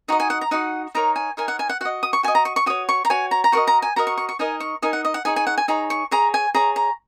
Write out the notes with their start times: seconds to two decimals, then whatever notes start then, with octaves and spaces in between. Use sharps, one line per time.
0.08 D#4 F#4 D#5 A#5
0.20 G#5
0.30 F#5
0.41 A#5
0.51 D#4 F#4 D#5 F#5
0.95 D#4 A#4 C#5 A#5
1.16 G#5
1.37 D#4 A#4 C#5 G#5
1.48 F#5
1.59 G#5
1.69 F#5
1.81 F#4 F#5
1.85 D#5
2.03 D#6
2.13 C#6
2.23 F#4 G#5
2.28 D#5
2.35 A#5
2.45 C#6
2.56 C#6
2.66 F#4 C#5 D#6
2.89 C#6
3.05 A#5
3.10 F#4 C#5 G#5
3.31 A#5
3.44 A#5
3.52 F#4 A#4 D#5 C#6
3.67 A#5
3.82 G#5
3.96 F#4 A#4 D#5 A#5
4.07 C#6
4.17 C#6
4.29 C#6
4.39 D#4 A#4 D#5 G#5
4.60 C#6
4.82 D#4 A#4 D#5 G#5
4.93 F#5
5.05 D#5
5.14 F#5
5.25 D#4 G#4 C#5 G#5
5.36 G#5
5.47 F#5
5.58 G#5
5.68 D#4 G#4 C#5 A#5
5.90 C#6
6.11 G#4 C#5 A#5
6.34 G#5
6.54 G#4 C#5 A#5
6.76 A#5